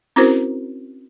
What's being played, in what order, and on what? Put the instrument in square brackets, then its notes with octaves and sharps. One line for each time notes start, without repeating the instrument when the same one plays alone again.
[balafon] C4 C#4 E4 F#4 A#4 C5